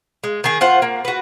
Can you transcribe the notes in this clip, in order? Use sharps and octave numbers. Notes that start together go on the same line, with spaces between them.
G#3
D#3 G#4
F4 C5 F#5
A#3
F#4 B4